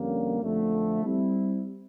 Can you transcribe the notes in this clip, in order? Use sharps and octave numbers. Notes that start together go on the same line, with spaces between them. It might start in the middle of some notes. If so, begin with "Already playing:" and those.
Already playing: F2 D3 G3 A#3 C#4
F2 D3 F3 A3
G3 C4 E4